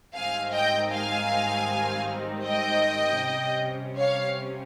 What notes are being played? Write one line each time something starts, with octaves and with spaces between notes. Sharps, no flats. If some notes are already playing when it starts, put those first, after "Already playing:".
G#2 D#3 G3 C4 D#4 F5 G#5
D#5 G5
F5 G#5
D#5 G5
C3 G3 C#4
C#5 F5